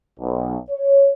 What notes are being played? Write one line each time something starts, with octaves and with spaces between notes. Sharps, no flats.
B1
C#5